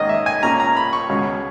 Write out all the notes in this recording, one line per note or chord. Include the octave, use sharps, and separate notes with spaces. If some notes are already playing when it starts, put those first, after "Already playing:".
Already playing: G#2 D#3 A#3 C#4 D#5
E5
G#5
A#2 A#3 C#4 A#5
A#5
B5
C#6
C#2 B2 G#3 C#4